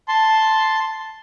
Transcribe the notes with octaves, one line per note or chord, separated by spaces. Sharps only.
A5 C6